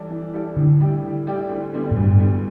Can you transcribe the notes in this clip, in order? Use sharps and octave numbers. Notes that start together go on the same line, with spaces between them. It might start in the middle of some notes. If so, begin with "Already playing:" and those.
Already playing: E3 G3 E4 A4 D5
E3
G3 E4 A4 D5
A2 D3
G3 E4 G4 D5
A2
G3 E4 G4 D5
D2
D3 G3 B3
A2
D2 G2
D3 G3 B3